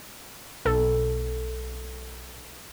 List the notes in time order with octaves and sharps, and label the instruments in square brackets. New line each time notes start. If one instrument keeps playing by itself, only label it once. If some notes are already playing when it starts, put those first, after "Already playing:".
[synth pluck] B1 A4